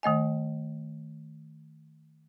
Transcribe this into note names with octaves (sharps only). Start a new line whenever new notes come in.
D#3 A3 D#5 G#5